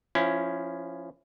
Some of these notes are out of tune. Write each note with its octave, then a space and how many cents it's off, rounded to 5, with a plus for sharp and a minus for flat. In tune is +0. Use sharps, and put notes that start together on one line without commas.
F3 +0 C#4 +0 E4 +20